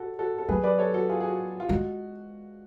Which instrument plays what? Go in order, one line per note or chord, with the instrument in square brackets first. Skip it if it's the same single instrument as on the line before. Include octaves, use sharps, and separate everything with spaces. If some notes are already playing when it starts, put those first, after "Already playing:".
Already playing: [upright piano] F#4 A4
F#4 A4
A4
[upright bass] F#3 [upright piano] G#4 B4
[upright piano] B4 D5
A4 C#5
F#4 A4
F4 G#4
G#4
F#4
F4
[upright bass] G#3 [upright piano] F#4